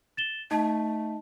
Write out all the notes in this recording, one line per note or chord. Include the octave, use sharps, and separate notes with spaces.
A6 E7 G7
A3 D#4 D#5 A5